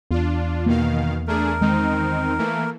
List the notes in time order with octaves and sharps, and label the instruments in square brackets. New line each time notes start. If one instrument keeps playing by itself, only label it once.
[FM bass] E2 [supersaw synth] D4 F4
[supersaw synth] B2 D#3 F5 [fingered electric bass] A#3
[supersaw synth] A3 D4 G#4 [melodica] A#4
[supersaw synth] D#3 C4 D#4 [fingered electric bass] G#3
[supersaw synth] E3 A3 A#3